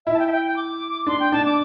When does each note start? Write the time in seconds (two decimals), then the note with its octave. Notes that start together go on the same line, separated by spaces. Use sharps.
0.06 E4 E5
0.14 A5
0.19 G5
0.27 E5
0.32 G5
0.45 G5
0.56 D6
1.07 D4 C6
1.20 G5
1.32 D4 A5
1.45 D6